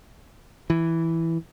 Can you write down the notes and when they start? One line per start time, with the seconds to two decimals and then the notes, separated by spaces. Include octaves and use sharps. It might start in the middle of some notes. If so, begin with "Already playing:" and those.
0.70 E3